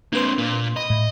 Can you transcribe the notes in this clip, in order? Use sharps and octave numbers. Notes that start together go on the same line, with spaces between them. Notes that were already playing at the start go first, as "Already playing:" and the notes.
A#3 C4 D4 B4 C6
A#2 A#3
D#5 B5
A2